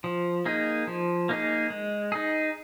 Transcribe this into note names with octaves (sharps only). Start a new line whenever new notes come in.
F3
A#3 D#4 G#4
F3
A#3 D#4 G#4
G#3
D#4 G#4